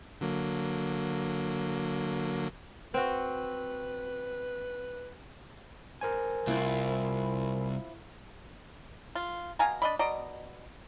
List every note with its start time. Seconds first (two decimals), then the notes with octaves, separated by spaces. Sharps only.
0.21 D3 F#3 A#3
2.94 C4 F#4 B4
6.01 A#4 C5 G#5
6.47 C2 C4 E4 F4
9.15 F4
9.59 B2 F5 G#5 A#5
9.82 D4 D#5 B5
9.99 B2 D5 D#5 A#5